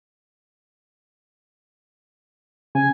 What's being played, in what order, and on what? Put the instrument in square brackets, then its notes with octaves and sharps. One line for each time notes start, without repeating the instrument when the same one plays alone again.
[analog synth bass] C#3 [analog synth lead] G#5